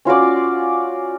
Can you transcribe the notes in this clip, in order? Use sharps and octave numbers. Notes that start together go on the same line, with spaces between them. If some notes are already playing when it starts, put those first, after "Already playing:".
C#4 F4 F#4 D5